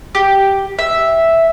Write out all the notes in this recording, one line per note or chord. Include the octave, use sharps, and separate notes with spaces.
G4
E5